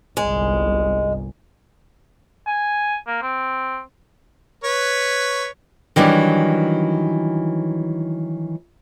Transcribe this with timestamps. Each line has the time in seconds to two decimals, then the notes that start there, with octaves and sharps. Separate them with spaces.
0.17 G1 C2 G#3
2.47 G#5
3.07 A#3
3.22 C4
4.64 B4 C#5
5.96 D#3 E3 F#3 G3 D4